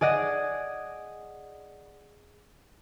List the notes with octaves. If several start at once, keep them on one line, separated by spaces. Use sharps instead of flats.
G#4 D5 D#5 F#5